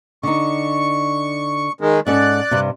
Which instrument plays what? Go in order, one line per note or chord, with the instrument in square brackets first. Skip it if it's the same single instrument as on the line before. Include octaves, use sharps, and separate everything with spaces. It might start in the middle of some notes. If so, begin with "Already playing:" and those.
[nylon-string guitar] D3 D#4 [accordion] C#6
[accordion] D#3 G#3
[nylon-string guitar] G#2 C#4 A4 [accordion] D5 F#6
[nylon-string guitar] G2 C3